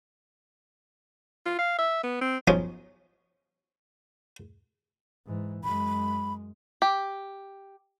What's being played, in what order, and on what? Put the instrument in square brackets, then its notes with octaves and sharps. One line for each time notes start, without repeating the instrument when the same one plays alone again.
[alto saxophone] F4
F5
E5
B3
C4
[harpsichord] B1 F3 C#4 D#5
[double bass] G#2 E3
[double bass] F#2 G#3 [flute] B5
[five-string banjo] G4